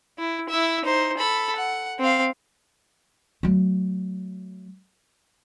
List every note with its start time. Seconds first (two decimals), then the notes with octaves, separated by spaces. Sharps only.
0.19 E4
0.49 E4 E5
0.85 D#4 C5
1.17 A4 B5
1.56 F#5
1.99 C4 F5
3.43 F#3 A3